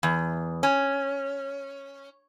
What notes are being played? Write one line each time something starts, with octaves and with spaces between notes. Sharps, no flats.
E2
C#4